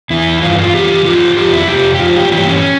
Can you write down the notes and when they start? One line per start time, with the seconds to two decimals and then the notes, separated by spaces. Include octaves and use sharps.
0.10 E2 E3 E4
0.42 G2 E3 F4
0.58 F4
0.74 F2 E3 G4
1.05 G#2 F3 F4
1.37 F2 C3 F3 G4
1.53 E4
1.68 F2 C3 G4
1.95 G4
2.00 G#2 F3 F4
2.16 G4
2.32 G2 E3 G4
2.48 C#4